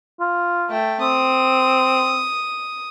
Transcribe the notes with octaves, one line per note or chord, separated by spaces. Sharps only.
F4
A3 G5
C4 D#6